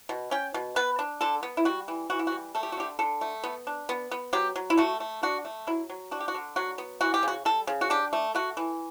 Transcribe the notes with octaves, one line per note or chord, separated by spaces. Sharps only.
B2
C#4 G5
B2
B3 B4
D4
D3 A4
B3
E4
G3 F#4
E3
E3 F#4
E4
F#4
G3
A3 A4
G4
F#4
D3 G4
D3 A4
A3
B3
D4
B3
B3
F#3 G4
F#3
E4
A3 F#4
A3
D4 F#4
A3
F#3 E4
F#3
D4 F#4
G4
F#4
D3
F#3 F#4
B3
E3 F#4
G4
C#3 F#4
G3 A4
C#3
F#4
D4 G4
A3
A3 F#4
E3